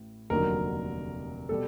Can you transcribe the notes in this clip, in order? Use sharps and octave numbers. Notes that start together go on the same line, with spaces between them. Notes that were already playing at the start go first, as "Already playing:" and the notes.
Already playing: A1 A2
F1 D#2 D3 F#3 A#4
B2 G3 B3 A4